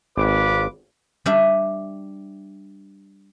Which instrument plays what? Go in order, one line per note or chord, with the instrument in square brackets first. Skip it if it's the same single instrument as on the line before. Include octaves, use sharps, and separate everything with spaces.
[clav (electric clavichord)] G#1 [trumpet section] F4 B4 D6
[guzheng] G3 D4 E5